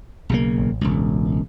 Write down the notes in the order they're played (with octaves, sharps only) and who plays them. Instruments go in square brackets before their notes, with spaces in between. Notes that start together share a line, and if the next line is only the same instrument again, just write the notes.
[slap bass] B1 C#3 A#3
[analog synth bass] A1
[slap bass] E1 C#2